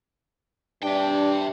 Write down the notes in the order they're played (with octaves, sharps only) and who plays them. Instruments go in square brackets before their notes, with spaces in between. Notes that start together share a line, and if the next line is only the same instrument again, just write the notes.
[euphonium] G2 [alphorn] D4 [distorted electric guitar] E5 G5